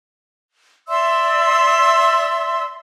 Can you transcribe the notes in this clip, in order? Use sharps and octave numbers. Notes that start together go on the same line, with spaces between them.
D5 E5 C6 E6